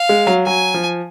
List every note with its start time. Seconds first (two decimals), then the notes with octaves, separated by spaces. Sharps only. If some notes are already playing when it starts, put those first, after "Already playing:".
Already playing: F5
0.09 G#3
0.27 F#3
0.46 F#3 G#5
0.74 F3